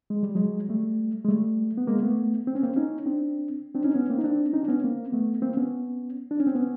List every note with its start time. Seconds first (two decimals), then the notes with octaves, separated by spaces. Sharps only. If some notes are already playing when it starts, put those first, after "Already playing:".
0.10 G#3
0.23 G3
0.35 F#3 G#3
0.69 G3 A3
1.25 G#3
1.28 G3 A3
1.77 B3
1.87 G#3 A#3
2.02 A3 B3
2.47 C4
2.55 C#4
2.63 A#3 C4
2.76 C#4 D#4
3.06 C4 D4
3.75 C4 D4
3.84 C#4 D#4
3.94 B3 C#4
4.10 A#3 C4
4.18 D#4
4.24 C4 D4
4.53 C#4 D#4
4.63 D4
4.68 B3 C#4
4.83 A#3 C4
5.12 A3 B3
5.42 A#3 C4
5.57 B3 C#4
6.31 D4
6.40 C#4
6.47 C4
6.55 B3 C#4